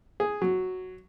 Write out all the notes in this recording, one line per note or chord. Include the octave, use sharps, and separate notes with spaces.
G#4
F#3